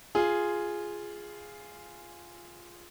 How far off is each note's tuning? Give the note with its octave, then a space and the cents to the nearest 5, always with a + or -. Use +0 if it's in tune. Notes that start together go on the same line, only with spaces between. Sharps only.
F4 -5 G#4 +0